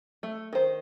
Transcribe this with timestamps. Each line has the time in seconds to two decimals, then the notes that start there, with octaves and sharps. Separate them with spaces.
0.23 A3
0.53 D#3 C5